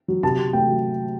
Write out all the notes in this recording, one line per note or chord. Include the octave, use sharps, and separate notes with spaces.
F#3
C3 A5
C3
A3 G5
F#3